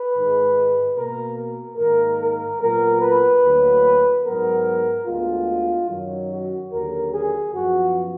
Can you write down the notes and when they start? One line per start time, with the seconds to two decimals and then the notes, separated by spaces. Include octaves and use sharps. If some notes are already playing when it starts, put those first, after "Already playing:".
Already playing: B4
0.14 G#2 D#3 G#3
0.96 B2 A#3 A#4
1.37 A#4
1.78 G#2 D#3 A#3 A#4
2.19 A#4
2.61 A#2 F#3 B3 A#4
3.02 B4
3.43 D2 D3 F#3 A#3
4.25 G#2 F#3 B3 A#4
5.07 D2 D3 G#3 B3 F4
5.89 F#2 D#3 F#3
6.31 F#4
6.72 D#2 D3 F#3 A#4
7.13 G#4
7.54 F#2 F3 B3 F#4